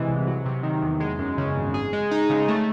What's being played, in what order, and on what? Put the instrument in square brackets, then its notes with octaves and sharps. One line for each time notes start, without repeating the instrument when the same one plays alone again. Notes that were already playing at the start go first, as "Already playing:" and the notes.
Already playing: [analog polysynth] C3 E3 G#3
C2
F#3
C3
D#3
E2
G#3
F#2
C#3
G#1
G#4
G#3
D#4
C#3
A3